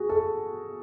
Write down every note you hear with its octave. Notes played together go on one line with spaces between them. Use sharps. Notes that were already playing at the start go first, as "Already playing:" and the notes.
Already playing: F#4 G#4
A4